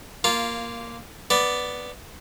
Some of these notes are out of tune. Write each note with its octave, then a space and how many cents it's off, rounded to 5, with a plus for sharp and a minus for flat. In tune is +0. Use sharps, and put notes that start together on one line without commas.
A#3 +0 F4 -10
B3 +0 D5 +0